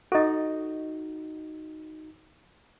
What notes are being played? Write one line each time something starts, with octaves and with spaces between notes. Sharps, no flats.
D#4 F#4 A4 D#5